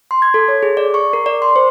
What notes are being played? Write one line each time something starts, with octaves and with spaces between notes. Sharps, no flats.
C6
G#6
A4
C#5
G#4
D5
C#6
A#4
D5
C6
C5